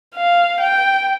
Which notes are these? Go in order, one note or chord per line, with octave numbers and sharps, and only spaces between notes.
F5
G5